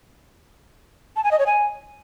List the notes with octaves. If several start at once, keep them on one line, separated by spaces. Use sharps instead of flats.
A5
G#5
D#5
C#5
G#5